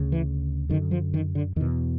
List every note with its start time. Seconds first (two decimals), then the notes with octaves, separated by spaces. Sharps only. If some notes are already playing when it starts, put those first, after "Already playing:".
Already playing: D2 C#3
0.12 E3
0.69 F#2 D3 D#3
0.91 F3
1.14 D#3
1.35 D3
1.56 E2 D#3
1.61 B2